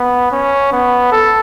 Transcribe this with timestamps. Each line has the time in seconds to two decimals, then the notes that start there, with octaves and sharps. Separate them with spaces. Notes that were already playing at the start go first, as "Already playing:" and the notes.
Already playing: B3
0.32 C#4
0.72 B3
1.12 A4